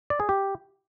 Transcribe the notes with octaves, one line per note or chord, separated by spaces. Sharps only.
D5
G#4
G4